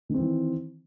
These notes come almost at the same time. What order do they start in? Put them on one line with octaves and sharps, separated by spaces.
D#3 C4 E3